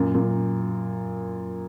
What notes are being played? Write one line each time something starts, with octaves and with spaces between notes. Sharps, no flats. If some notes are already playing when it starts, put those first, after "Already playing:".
Already playing: F#2 A#2
F#2 A#2